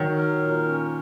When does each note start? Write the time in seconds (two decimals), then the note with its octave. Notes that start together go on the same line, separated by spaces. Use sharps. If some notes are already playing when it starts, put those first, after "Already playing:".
Already playing: D#3 F#3
0.16 A#4
0.39 A#2
0.64 C#4